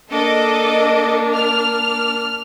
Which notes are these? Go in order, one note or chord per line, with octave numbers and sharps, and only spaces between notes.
A#3 D4 A4 D#5 D6
F6